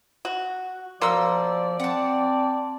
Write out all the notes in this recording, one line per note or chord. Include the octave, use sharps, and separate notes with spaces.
F#4
B2 F3 A#3 D5 C6 E6
C4 F#5 A5